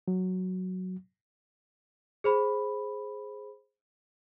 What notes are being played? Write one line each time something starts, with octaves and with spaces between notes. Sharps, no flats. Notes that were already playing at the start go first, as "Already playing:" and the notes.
F#3
G#4 C5 B5